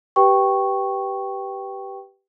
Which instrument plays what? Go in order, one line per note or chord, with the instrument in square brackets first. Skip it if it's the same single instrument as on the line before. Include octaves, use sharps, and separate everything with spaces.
[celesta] G4 B4 G5 C#6